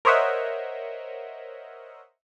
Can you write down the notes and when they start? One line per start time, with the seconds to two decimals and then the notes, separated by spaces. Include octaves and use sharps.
0.05 A#4 C5 C#5 D#5 E5 F#5